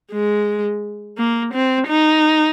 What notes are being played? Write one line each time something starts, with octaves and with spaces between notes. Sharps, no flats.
G#3
A#3
C4
D#4